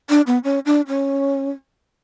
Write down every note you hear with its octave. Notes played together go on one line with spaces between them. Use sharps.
D4
B3
C#4
D4
C#4